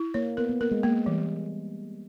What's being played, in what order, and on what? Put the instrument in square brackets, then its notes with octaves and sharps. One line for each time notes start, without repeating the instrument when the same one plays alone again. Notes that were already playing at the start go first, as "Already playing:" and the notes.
Already playing: [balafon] E4
[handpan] A#3 [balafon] C#5
[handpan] B3 [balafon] A#4
[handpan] B3
[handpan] A#3 [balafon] A#4
[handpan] G#3
[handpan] G#3 [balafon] A#3
[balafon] E3 [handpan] G3